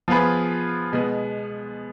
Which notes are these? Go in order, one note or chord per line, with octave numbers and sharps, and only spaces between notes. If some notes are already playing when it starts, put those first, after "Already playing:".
F3 B3 F4 G#4 B4
B2 G#3 B3